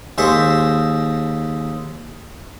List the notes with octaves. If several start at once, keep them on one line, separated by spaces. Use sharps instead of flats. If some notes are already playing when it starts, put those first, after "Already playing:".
D#2 G#3 C5 E5 C#6